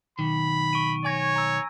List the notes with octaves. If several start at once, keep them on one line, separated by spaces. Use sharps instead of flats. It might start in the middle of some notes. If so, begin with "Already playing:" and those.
B1 D#3 B5
C#6 D7 D#7
C#5 G#5 G#6 A#6
A#5 E6